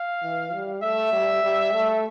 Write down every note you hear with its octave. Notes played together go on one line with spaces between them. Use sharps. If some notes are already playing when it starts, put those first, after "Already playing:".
Already playing: F5
E3
G3
A3 E5
G3
G3
A3